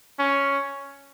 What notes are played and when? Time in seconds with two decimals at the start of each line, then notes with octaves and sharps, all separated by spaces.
0.19 C#4